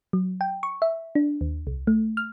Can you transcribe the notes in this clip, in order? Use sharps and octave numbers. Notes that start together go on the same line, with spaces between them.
F#3
G5
C#6
E5
D4
D#2
C2
A3
F6